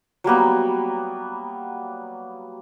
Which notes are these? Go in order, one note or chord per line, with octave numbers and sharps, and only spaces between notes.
F#3 G3 A#3 B3